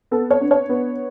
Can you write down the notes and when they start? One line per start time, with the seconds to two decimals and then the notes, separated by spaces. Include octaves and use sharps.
0.11 B3 A4
0.30 C#5
0.41 D4
0.51 C#5
0.69 B3